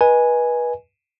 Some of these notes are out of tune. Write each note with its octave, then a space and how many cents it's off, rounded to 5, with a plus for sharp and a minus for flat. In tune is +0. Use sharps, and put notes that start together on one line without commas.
B4 -25 D#5 +0 G#5 +0